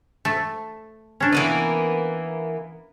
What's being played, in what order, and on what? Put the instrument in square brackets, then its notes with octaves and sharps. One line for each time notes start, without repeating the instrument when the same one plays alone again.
[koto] A3
C#4 D4
[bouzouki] E3 A#3 B3